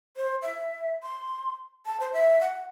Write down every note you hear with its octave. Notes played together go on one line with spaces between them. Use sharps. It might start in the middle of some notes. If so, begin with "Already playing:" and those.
C5
E5
C6
A5
C5
E5
F#5